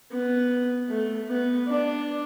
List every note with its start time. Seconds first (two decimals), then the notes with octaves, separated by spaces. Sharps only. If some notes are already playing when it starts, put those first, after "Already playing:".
0.12 B3
0.89 A3
1.28 B3
1.68 D4